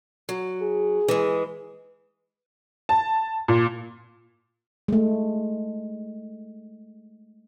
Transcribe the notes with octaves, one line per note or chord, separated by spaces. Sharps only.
F#3
G#4
E3 G#3
A5
A#2
G#3 A3